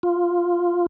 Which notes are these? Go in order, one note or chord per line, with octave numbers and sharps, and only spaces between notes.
F4